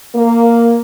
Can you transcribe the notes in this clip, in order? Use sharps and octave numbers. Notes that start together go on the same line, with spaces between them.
A#3